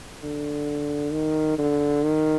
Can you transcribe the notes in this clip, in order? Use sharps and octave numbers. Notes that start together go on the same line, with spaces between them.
D3
D#3
D3
D#3